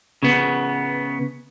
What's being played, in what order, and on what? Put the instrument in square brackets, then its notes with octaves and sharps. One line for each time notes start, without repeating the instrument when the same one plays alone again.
[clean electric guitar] C#3 B3